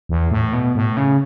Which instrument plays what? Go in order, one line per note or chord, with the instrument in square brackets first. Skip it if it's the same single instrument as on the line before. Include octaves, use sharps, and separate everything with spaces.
[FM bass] E2
A2
B2
A2
C#3